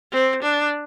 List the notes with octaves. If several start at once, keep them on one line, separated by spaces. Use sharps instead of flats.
C4
D4